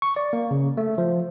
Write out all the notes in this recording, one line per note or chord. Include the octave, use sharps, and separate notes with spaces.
C#6
D5
A#3
C#3
A3
F3